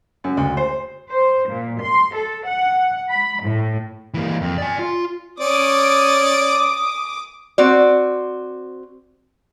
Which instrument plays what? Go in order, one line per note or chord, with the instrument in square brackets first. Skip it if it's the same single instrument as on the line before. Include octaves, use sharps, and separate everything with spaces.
[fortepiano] F#2
D2
C5
[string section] C5
A#2
C6
A4
F#5
B5
A2
[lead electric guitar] E3 A#3
F2
D5 G#5
F4
[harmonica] C#4 D5 [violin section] D6 D#6
[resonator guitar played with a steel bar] C4 F#4 D5